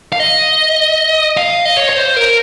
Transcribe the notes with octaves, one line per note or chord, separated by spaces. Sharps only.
F5
D#5
F5
D#5
C#5
C#5
C5
A#4